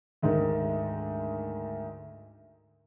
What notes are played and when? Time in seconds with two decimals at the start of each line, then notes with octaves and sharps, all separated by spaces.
0.23 D2 G#2 D#3